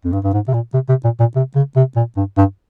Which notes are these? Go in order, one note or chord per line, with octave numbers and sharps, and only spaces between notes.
F2
G2
G2
G#2
C3
A#2
C3
C3
A#2
A#2
C3
C#3
C3
A#2
G2
G2